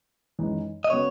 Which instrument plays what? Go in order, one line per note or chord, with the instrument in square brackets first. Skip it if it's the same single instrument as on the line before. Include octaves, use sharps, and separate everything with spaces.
[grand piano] F#2 E3 G#3 D#4
[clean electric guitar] D#5
[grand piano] C#3 F#3 B3 [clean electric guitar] C#5